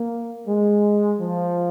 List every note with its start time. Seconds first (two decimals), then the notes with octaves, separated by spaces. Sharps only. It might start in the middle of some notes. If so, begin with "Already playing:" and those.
Already playing: A#3
0.48 G#3
1.21 F3